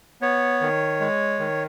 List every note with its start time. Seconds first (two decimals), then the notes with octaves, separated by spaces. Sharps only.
0.22 B3 C#5
0.61 D#3
1.00 G#3
1.39 D#3